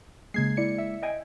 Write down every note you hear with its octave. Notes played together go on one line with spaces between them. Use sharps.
C#3 G#3 A#3 G#6 C7
E4 D5 C#7
E5
D#5 G5 G#5